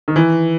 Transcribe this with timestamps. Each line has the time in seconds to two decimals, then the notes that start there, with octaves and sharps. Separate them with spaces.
0.08 D#3
0.16 E3